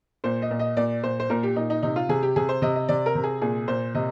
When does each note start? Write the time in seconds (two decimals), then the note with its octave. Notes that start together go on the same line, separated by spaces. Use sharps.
0.24 A#2 C5
0.42 D#5
0.51 A#2
0.59 D#5
0.77 A#2 D5
1.03 A#2 C5
1.20 C5
1.30 A#2 A#4
1.43 G4
1.56 A#2 D#4
1.70 D#4
1.83 C3 D#4
1.96 F4
2.09 C3 G#4
2.23 G4
2.36 C3 G#4
2.49 C5
2.62 C3 D#5
2.75 D#5
2.89 C3 D5
3.06 A#4
3.15 C3
3.24 G#4
3.42 A#2 G#4
3.68 A#2 C5
3.95 C3 D#5